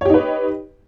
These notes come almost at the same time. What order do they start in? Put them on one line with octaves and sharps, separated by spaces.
C#5 G4 D#4 B4